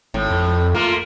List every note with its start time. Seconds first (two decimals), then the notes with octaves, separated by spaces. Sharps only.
0.14 G#1 A2
0.31 F2
0.75 A3 A#3 F4